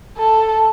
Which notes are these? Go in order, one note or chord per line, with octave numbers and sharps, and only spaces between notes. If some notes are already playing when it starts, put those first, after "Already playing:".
A4